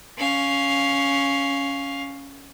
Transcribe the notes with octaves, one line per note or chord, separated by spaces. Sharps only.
C#4 F5